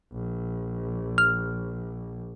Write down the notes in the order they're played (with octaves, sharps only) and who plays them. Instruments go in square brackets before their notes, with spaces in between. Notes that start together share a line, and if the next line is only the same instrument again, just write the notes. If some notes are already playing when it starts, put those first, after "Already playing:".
[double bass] A#1
[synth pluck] F6